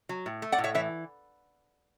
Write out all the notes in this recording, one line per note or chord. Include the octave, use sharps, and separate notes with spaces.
F#3
A2
A3
D5 F#5
A2
C#5 E5
E3 C#5 E5